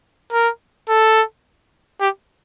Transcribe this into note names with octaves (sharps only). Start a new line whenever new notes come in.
A#4
A4
G4